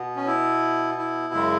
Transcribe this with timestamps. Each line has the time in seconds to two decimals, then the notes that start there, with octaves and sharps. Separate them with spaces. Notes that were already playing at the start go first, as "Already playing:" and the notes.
Already playing: B2 B3
0.16 C#4
0.27 E4
0.98 E4
1.34 F#2 C#3 G#3